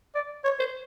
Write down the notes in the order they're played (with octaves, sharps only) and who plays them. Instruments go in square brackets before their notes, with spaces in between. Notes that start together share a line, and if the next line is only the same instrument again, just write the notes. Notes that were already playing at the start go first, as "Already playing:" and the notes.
[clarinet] D5
C#5
C5